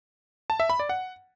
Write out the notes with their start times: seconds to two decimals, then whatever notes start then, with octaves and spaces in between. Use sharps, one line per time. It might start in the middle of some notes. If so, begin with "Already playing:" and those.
0.50 A5
0.60 E5
0.70 B5
0.79 D5
0.89 F#5